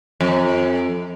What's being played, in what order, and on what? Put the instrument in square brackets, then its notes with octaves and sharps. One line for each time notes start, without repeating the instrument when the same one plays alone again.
[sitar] F2